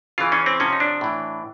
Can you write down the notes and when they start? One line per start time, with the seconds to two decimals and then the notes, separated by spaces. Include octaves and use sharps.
0.18 C#3 E3 F4
0.32 C#4
0.46 C4
0.60 C3 F3 C#4
0.72 D#4
0.80 D4
1.01 A2 E3